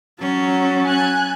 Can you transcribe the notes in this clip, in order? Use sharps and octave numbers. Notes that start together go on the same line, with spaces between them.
F#3 C#4 A5
G#5 F#6 G#6